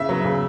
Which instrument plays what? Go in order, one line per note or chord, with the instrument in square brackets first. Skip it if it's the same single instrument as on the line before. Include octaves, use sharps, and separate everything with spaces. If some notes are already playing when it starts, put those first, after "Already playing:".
Already playing: [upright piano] C#3 E5
F#3 B3
C#3